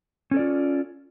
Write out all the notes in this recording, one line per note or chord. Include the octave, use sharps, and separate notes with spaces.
C#4 F4 A4 D5